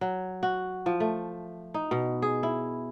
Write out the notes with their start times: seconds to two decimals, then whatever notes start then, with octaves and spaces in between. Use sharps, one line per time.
0.01 F#3
0.43 F#4
0.86 F3
1.00 A3
1.74 D#4
1.91 B2
2.22 G#4
2.43 E4